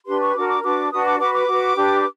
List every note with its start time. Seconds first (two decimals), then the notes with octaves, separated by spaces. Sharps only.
0.06 D4 G4 B4 C6
0.21 C#6
0.35 D4 F#4 A#4 D6
0.48 D6
0.63 D4 F#4 B4 D6
0.91 D4 F#4 B4 D#6
1.05 D6
1.19 F#4 B4 D6
1.34 D6
1.48 F#4 B4
1.76 D4 G4 B4